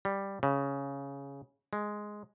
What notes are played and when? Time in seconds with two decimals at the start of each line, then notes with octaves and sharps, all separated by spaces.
0.05 G3
0.43 C#3
1.73 G#3